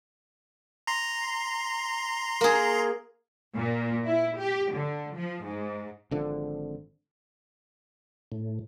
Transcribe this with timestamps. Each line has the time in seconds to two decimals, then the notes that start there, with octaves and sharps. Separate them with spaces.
0.87 A#5 C6
2.41 A#3 G#4
3.57 A#2
4.05 E4
4.38 G4
4.74 D3
5.14 F3
5.44 G#2
6.11 G#1 D3 F3
8.32 A2